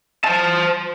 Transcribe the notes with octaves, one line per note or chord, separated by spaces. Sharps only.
C5 A5